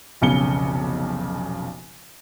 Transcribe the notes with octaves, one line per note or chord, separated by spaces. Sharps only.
F1 B1 C#3 C#7 G7